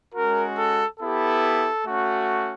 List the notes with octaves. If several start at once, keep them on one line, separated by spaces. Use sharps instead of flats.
G#3 C#4 F#4 A#4
A4
B3 E4 G4 A4
A3 C#4 F#4